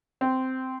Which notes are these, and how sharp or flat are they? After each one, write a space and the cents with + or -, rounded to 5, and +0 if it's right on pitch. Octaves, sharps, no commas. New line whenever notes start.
C4 -10